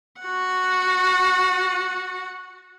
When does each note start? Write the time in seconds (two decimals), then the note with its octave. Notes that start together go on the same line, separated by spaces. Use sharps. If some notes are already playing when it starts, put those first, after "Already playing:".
0.21 F#4 F#5